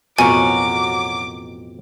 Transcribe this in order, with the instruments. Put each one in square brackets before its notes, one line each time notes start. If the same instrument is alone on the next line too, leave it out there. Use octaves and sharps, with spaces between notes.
[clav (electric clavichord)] A1 F2 B2 [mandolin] F#4 A#4 C#5 [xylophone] G#5 [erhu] D6